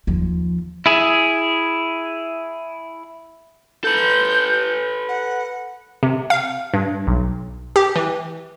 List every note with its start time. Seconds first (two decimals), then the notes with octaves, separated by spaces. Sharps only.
0.07 D#2 F3
0.86 E4 G#4
3.84 A4 B4 G6
5.08 F#5
6.03 C3
6.30 F5
6.74 G2
7.07 B1
7.76 G4
7.96 E3